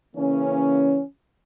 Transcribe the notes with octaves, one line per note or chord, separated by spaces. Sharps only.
C#3 E3 A#3 C#4